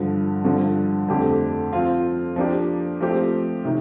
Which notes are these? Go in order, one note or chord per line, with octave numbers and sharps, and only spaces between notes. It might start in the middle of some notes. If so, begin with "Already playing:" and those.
Already playing: G2 D3 F3
G2 D3 F3
F2 D3 A3 C4 G4
F3 C4 F4
F3 A#3 D4 G4
F3 A3 C4 G4
C3 D#3